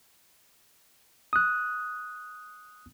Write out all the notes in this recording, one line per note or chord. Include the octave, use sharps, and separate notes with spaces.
D#6 F#6